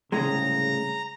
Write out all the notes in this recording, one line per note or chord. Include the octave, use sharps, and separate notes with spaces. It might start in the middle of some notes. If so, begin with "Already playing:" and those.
C2 A2 C#3 G#3 A#5